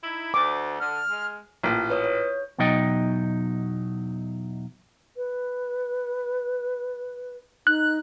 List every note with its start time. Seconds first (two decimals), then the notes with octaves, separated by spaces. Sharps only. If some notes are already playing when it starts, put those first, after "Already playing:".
0.03 D#4 E4
0.34 D2 D6
0.80 D3 F6
1.09 G#3
1.63 A1 A#2 G5
1.90 B4 C#5 D#6
2.04 C#5
2.58 E2 B2 F#3 D#4 D#5 G5
5.17 B4
7.67 D#4 F#6